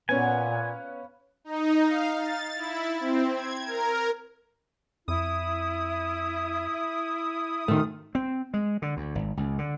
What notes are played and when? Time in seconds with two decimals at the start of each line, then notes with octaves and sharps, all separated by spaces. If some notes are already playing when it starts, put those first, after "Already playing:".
0.09 A#2 B3 C#4 B4 F5 F#5 G#5
1.44 D#4
1.86 F5
2.18 A6
2.56 E4
3.00 C4
3.34 G#6
3.65 A#4
5.08 F2 E4 D#6
7.68 A2 D#3 A3 F4 F6
8.15 C4
8.54 G#3
8.82 D3
8.97 D2
9.15 G#1
9.37 C#2
9.58 D3